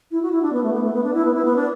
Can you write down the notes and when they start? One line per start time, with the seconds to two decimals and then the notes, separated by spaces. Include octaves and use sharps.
0.11 E4
0.23 F#4
0.32 E4
0.42 D4
0.53 B3
0.64 A3
0.73 B3
0.84 A3
0.93 B3
1.03 D4
1.14 E4
1.25 B3
1.34 E4
1.45 B3
1.56 D4